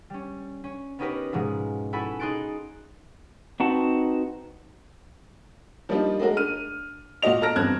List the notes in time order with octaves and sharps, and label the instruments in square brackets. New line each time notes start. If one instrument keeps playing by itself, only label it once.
[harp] G3 C#4
C#4
B3 C#4 D#4 G4 A#4 B4
G#2 B2 F3 G#3
E4 F#4 A4 G#5 B5
D#4 G#4 C6 F#6 A6 D7
[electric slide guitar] C4 D#4 F#4 B4 F#5 A5
[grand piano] F3 G3 A#3 D4 D#4 F4
G#3 A3 F#4 A#4
D4 F6 D#7
A#2 F4 F#4 D#5 F7
A4 A5 A#5 F6 A#6 D7
E2 G2 F3 C4 F#6 G#6